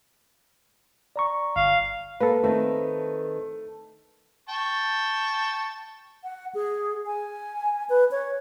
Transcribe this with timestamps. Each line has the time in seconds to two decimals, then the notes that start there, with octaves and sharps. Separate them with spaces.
1.16 D5 A#5 C#6
1.56 G1 F5
2.20 A#3 A4 B4
2.43 D#3 A3 C4
4.49 G5 A5 C#6
6.24 F#5
6.55 G#4
7.06 G#5
7.89 B4
8.11 C#5